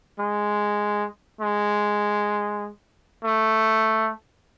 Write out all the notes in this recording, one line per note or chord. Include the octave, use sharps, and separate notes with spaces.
G#3
G#3
A3